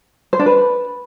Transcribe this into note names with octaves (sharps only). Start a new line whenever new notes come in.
C5
D4
B4